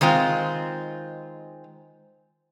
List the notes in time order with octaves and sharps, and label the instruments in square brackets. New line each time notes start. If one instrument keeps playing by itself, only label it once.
[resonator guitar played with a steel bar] D#3 G#3 C4 F4